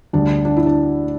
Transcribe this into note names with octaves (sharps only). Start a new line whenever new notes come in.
D2 D3 G3 D4
D4
E4
D4